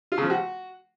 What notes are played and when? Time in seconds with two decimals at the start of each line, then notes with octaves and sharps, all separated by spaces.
0.12 F4
0.18 C#3
0.24 F3
0.30 F#4